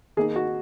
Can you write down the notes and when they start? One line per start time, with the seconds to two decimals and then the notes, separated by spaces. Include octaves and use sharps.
0.17 D#3 A#3 D#4 G#4
0.36 F#4